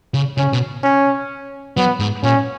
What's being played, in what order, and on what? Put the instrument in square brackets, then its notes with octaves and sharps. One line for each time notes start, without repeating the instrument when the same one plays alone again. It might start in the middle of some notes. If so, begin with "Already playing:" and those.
[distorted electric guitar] C#3
[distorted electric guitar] C#3 [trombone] C#4
[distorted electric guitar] B2
[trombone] C#4
[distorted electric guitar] F#3 [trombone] B3
[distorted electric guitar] G#2
[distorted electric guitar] A#2 [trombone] C#4